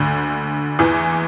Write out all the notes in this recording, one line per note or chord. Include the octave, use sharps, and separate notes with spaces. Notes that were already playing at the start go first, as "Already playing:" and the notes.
Already playing: D2 D3
E2 E3